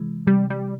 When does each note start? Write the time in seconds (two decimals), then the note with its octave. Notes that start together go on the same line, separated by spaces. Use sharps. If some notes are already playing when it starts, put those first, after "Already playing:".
Already playing: C3 E3 G#3
0.27 C3 G3
0.50 G3